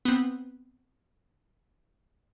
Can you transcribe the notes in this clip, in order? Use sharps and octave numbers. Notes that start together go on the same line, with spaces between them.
B3 C4